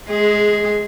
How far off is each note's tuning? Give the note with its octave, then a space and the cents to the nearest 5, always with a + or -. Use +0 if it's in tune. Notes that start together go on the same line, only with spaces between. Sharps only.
G#3 +20 G#4 +0